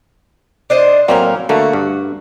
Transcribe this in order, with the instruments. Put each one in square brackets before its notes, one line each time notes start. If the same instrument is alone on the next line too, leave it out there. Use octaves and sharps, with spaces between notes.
[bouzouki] D4 C5 D#5
[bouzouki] A2 C#4 A#4 [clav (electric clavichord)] F#3 A#3 C4
[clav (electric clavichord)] D3 A3 A#3 [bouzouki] F#4
[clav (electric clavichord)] G2